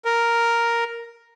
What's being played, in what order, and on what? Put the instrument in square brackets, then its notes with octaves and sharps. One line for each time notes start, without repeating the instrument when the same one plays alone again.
[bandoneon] A#4